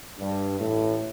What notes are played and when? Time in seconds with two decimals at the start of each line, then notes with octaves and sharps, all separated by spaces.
0.20 G2
0.60 A1 A2